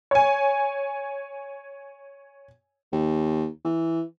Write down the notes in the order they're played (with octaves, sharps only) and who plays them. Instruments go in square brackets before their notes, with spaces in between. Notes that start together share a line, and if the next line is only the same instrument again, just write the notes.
[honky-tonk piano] C#5 G#5
[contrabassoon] D#2
E3